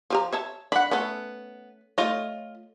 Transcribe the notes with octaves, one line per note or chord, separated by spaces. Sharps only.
F3 G4 A#5
C#5 E5 A5
D4 F#5 B5
A3 B3 C#4 A4
A3 F4 C#5 D#5